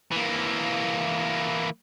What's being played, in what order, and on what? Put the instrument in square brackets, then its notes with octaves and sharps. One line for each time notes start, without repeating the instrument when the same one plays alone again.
[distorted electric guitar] E3 A#3